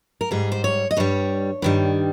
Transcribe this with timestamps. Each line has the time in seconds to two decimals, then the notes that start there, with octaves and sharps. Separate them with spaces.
0.21 A#4
0.31 G#2 G3 G#4
0.52 C5
0.64 C#5
0.91 D#5
0.97 G2 G3 C#5
1.62 G2 D#3 G3